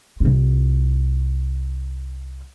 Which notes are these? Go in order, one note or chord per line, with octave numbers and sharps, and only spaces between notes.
C2 F4